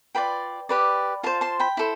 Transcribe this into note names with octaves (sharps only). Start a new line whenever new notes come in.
F4 B4 D5 G5 B5
G4 B4 D5
F4 C5 F5 A5
A5 C6
G5 B5
E4 A4 C5